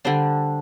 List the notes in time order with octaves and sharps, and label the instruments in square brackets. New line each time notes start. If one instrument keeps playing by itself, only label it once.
[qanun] D3 G3 D4 C5